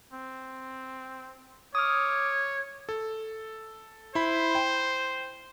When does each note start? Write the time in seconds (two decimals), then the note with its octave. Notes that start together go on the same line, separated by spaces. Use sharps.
0.14 C4
1.75 C#5 D6 D#6 F6
2.89 A4
4.15 E4 C5 B5
4.55 G5